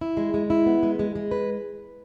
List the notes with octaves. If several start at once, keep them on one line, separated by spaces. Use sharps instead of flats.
E4
G#3
G#3
E4
B3
G#3
G#3
G#3
B4